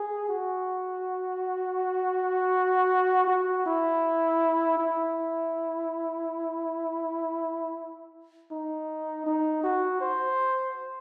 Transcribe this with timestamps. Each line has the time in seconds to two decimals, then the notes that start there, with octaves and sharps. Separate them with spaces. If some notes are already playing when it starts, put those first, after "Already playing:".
Already playing: G#4
0.29 F#4
3.28 F#4
3.66 E4
4.78 E4
8.52 D#4
9.26 D#4
9.64 F#4
10.01 C5